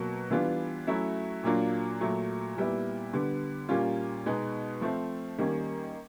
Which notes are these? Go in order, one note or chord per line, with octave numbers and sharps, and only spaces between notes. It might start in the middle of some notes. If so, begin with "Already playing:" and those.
Already playing: B2 F#3 A#3
E3 G3 B3 D4 F4
F#3 A3 C#4 E4
A#2 F#3 A#3 D4 F4
A#2 F#3 A3
A#2 G3 B3 E4
D3 G3 B3
A#2 G3 A#3 C#4 F4
B2 G#3 B3 D#4
F3 A3 C4
D#3 G3 A#3 C#4